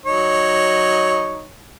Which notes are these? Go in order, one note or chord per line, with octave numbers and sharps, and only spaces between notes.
F#3 D#4 C#5